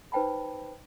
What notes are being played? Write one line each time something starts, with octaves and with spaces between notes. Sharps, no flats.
D#4 B4 C5 G5 A5 B5